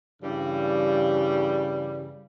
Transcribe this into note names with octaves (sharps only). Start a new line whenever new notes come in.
G2 C#3 E3 G3